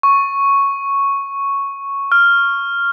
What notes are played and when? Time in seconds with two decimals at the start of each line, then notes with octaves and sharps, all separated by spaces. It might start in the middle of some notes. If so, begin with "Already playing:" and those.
0.03 C#6
2.12 F6